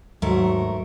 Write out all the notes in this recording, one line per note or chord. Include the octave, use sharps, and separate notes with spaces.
D#2 G#2 F#3 A3 A#4